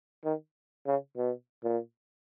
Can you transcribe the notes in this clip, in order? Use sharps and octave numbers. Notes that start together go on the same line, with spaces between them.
D#3
C#3
B2
A#2